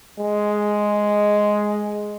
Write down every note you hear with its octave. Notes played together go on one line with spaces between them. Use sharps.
G#3